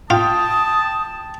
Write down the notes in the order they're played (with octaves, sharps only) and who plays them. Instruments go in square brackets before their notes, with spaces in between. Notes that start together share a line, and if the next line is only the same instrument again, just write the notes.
[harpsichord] F4 [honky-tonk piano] G5 [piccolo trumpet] A5 [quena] D#6